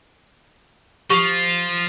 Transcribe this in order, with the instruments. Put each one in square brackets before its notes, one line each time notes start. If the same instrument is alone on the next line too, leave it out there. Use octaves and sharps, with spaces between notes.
[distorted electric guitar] F3 [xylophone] G4 C#6